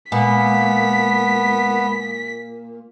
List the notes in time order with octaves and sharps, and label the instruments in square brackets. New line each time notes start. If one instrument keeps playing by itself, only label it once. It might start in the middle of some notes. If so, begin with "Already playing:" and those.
[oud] A#2 [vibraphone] G#3 [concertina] B3 [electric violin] B6